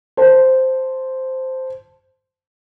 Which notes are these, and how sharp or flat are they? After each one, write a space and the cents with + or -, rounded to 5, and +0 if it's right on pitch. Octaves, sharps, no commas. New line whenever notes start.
C5 -5 A5 +0